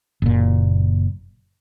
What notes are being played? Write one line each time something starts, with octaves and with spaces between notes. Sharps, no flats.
F#1 A#2